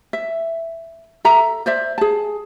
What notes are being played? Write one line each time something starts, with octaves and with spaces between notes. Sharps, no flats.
E5
A4 E5 A#5
C5 D5 E5
G#4 A5